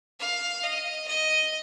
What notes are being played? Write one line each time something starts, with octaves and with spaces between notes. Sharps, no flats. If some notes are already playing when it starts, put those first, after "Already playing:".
F5
D#5
D#5